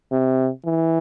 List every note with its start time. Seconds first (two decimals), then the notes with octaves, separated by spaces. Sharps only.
0.12 C3
0.65 E3